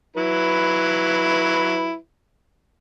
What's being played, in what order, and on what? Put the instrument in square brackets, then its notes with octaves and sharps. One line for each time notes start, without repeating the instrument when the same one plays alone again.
[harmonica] F#3 E4 B4